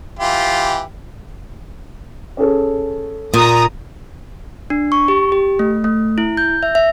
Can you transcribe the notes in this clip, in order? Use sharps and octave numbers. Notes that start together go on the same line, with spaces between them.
E3 F4 G4
C#4 G#4 A4
A#2 A#5 D#6
D4
C#6
G4
G4
A3
A3
E4
G6
E5
E5